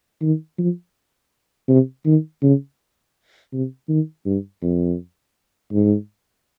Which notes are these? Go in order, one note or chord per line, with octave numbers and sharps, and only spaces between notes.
D#3
F3
C3
D#3
C#3
C3
D#3
G2
F2
G#2